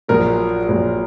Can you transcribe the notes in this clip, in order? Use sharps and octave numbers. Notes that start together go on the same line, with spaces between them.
A#1 A#2 F#3 A#4
A#1 A#2 F#3